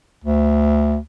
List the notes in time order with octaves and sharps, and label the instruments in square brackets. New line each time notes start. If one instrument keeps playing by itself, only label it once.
[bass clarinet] D2